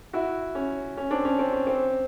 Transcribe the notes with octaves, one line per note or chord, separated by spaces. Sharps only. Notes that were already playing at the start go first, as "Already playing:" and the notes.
E4 F#4
C#4
C#4
C4 D4
C#4
C4
C#4
C4